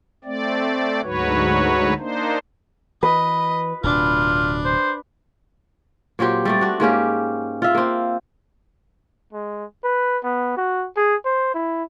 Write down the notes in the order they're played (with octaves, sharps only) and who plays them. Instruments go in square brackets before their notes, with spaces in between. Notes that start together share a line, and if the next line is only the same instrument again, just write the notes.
[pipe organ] A3 C4 D5
D2 G#2 F#3 F#4 B4 C#5
A#3 D4 D#4 C5
[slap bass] E3 [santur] B4 [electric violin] D#5
[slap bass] D1 B2 [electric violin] D4 [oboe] F4
[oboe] C5
[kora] A#2 F#3 C4 G4
G3 A3 D5
D4 F#4
G#2 A#3 C#4 G4
F4 E5
A#3 C4
[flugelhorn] G#3
B4
B3
F#4
G#4
C5
E4